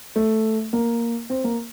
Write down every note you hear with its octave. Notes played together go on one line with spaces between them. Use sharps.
A3
A#3
C4
A#3